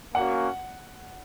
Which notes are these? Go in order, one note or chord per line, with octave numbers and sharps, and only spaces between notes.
A#3 C#4 F#4 F#5